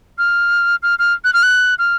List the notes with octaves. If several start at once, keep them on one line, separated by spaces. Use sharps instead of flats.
F6
F6
F6
F#6
F6
F#6
F6